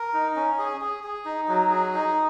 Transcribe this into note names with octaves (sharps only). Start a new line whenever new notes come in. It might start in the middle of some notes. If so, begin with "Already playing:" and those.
Already playing: A#4
D#4
C#4
G#4
G#4
G#4
D#4
F#3
G#4
D#4